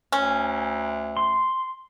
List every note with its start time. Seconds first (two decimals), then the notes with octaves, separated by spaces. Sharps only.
0.12 D2 C#4
1.17 C6